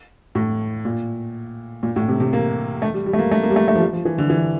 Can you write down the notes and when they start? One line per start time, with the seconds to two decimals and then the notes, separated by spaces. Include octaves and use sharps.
0.35 A2
0.85 A#2
1.83 A#2
1.96 A2
2.08 C3
2.20 C3
2.33 A#3
2.82 A3
2.94 G3
3.06 G3
3.13 A3
3.19 A#3
3.31 A3
3.43 A#3
3.50 G3
3.56 A3
3.68 A3
3.75 F3
3.80 G3
3.93 F3
4.05 E3
4.18 D3
4.30 E3